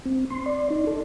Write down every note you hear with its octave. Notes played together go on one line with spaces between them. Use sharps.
C4
C6
D5
D#4
A4